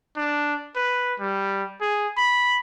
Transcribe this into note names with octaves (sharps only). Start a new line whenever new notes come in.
D4
B4
G3
G#4
B5